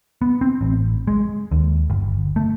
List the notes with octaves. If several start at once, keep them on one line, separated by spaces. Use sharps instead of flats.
B3
C4
A1
G#3
D#2
G1
A3